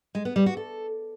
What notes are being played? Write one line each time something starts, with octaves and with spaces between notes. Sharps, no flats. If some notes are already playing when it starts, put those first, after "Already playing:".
G#3
B3
G3
F#4
A4